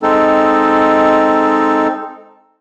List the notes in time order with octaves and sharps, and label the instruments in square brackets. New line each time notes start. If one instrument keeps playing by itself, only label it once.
[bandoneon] G#3 C4 D#4 A4